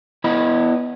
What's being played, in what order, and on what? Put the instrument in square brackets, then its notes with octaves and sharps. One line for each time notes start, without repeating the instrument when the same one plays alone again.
[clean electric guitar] B3 E4 D#5 B5